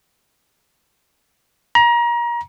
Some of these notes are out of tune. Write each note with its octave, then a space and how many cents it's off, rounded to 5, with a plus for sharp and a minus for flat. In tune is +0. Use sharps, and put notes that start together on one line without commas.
A#5 +30